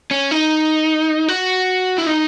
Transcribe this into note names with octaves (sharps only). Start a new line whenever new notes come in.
C#4
D#4
F#4
E4
D#4